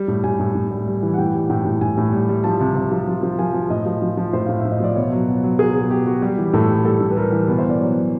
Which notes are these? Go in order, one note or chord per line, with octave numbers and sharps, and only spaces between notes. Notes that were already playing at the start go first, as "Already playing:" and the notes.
Already playing: G3
A2
A2 G#5
A2
A2
G3
G3
E3
F#5
A2 G5
G3
A2 G5
A2
A2 G#5
A2
G3
G3
F3 A5
C3
C3
F3
F3
F3
F3 G#5
F3
A2 D#5
F3
F3
F3
A2 C5
A2 F5
E5
A2
D#5
F3 D5
B2 C#5
F#3
B2
F#3
F#3 G#4
B2
F#3 G4
F#3 F#4
G3 G4
E3
A2 A4
G3
G3 A4
A2
B4
G3 A#4
E3
B2 B4
C5
B2
D5
F#3 C#5
F#3